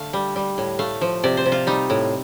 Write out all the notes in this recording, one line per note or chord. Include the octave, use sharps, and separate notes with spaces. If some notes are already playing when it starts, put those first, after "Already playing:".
Already playing: D3 A3 F5
G3
G3
A2
A3 F5
F3
C3 D5
C5
C3
F4
G3 D#4
A2